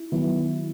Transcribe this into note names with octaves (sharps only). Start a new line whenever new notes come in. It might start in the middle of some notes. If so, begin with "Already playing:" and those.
Already playing: E4
D#3 F#3 B3 E4